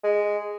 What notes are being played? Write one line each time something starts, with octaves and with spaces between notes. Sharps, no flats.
G#3